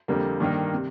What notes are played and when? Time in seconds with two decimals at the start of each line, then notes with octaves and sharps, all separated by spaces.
0.08 F2 D3 G3 A#3
0.40 G2 D#3 A#3
0.74 C3